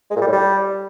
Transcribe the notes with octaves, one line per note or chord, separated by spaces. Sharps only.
G#3
A#2
G3
A2
G3